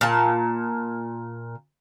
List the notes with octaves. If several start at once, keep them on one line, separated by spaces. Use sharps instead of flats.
A#2 A5